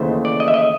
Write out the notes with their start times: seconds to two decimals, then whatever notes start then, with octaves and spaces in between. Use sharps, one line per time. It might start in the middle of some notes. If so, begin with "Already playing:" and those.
Already playing: D#2 C#3 E3 A3 C5
0.25 D5
0.40 D#5
0.48 E5
0.54 D#5